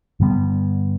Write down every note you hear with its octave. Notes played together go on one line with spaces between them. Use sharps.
G2 D3 G3 B3